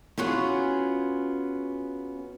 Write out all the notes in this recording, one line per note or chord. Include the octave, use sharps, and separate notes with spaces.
B3 C#4 F4 F#4 G#4